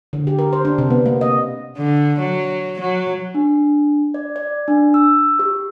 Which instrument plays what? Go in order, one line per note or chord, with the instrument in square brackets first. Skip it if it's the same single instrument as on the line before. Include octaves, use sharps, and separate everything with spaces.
[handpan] D3
G4
A#4
C5
D4
C3
B3
A#3
D#5
[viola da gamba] D3
F#3
F#3
[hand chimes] D4
D5
D5
D4
E6
G4